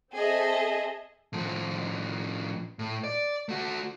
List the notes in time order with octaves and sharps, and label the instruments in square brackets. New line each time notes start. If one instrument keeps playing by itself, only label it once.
[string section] C4 G#4 A4 D#5 E5
[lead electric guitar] A2 F3
A2
D5
A3 F#4